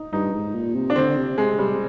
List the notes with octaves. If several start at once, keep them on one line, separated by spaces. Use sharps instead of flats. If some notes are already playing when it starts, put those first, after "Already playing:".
Already playing: D#4
G2 D#4
G#2
A#2
C3
D4
D3 C4
C3
C3 G#3
C3 G3